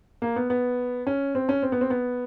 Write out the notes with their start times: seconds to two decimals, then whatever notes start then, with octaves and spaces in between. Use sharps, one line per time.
0.22 A#3
0.36 B3
0.50 B3
1.07 C#4
1.35 C4
1.49 C#4
1.63 C4
1.72 B3
1.81 C4
1.90 B3